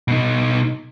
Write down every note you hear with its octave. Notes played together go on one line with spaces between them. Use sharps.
B2 D#4